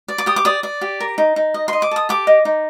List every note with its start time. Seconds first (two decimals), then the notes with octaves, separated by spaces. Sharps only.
0.08 D5
0.18 D6
0.26 G4 D#6
0.36 D6
0.45 D5 D#6
0.63 D5
0.81 G4
1.00 A#4
1.18 D#4
1.36 D#4
1.54 D#5
1.68 D#5 C6
1.82 D6
1.91 A4 D#6
2.09 G4 D6
2.27 D#5
2.45 D#4